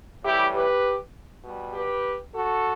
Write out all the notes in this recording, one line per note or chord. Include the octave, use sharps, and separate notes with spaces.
A2 E3 G3 E4 G4
G4 B4
B2 G3
G4 B4
F#4 A4